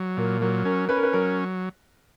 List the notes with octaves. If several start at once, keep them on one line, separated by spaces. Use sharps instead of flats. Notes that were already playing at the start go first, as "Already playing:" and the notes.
Already playing: F#3
A#2 A#4
F#3 A#4
C#4 A#4
C#4 B4
A#4
B4
F#3 A#4